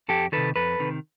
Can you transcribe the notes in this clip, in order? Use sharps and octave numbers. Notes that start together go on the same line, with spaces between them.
F2 G4 A4
C3 D#3 A4 B4
F2 A4 B4
C3 D#3